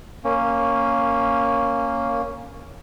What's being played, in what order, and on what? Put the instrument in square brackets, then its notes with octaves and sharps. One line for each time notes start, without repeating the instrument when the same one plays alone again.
[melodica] A#3 C#4